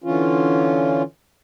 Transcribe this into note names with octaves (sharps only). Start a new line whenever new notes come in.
D3 E3 C#4 F4